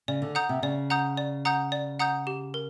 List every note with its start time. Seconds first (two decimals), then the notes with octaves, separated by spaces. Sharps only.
0.08 C#3 D5
0.22 D3
0.35 F#5 A#5 D#6 G6
0.49 C3
0.63 C#3 D5
0.90 F#5 A#5 D#6 G6
1.17 D5
1.45 F#5 A#5 D#6 G6
1.72 D5
1.99 F#5 A#5 D#6 G6
2.27 G4
2.54 A#4